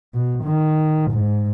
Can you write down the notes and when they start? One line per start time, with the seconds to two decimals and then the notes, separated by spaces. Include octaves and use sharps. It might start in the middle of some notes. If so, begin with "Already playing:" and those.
0.14 B2
0.44 D#3
1.11 G#2